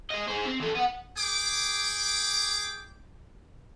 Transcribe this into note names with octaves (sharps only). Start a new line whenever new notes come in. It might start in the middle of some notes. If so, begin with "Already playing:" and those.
G#3 D#5
G#4 C5
C4
E3 A4
B3 F#5
G#4 G5 D6